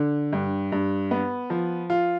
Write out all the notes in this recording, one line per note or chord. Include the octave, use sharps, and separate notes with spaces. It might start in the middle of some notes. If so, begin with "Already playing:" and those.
Already playing: D3
G2
G2
B3
F3
F4